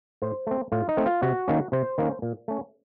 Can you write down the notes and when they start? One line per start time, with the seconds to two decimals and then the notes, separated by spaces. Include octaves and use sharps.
0.22 A2 C5
0.47 A3 C4
0.72 A2 F4
0.89 D#4
0.97 A3 C4
1.06 F4
1.22 C3 F#4
1.48 D#3 A#3 C#4
1.72 C3 C5
1.98 D#3 A#3 C#4
2.22 A#2
2.48 A3 C#4